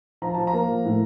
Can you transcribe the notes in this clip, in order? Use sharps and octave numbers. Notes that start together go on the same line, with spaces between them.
F3 A#5
F3 A5
A#5
A#3
F3
A2